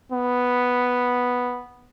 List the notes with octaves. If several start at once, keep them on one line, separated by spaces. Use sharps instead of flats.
B3